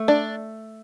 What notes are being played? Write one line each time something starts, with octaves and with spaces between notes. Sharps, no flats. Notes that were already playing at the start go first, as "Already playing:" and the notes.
Already playing: A3
D4 D5